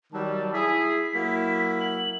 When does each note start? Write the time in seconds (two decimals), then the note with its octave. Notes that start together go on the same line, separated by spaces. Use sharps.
0.13 D#3 F#3 G3 A5
0.53 E4 G#4 B6
1.15 F#3 A#3 E4
1.80 F#7